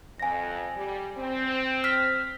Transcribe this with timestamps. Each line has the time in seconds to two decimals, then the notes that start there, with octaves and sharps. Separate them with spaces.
0.20 F2 G#5 A#6
0.76 G3
1.18 C4
1.84 F6 B6